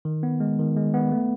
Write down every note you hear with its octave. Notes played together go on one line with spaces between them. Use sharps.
D#3
B3
G#3
D#3
G#3
B3
A3